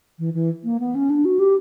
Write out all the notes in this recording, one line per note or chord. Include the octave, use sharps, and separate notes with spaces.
E3
E3
A#3
B3
C#4
D4
F#4
G4